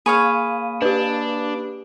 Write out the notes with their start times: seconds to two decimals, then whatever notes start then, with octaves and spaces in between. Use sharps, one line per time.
0.06 A#3 G#4 C#5 F5 B5 D#6 D#7
0.82 D4 G4 B4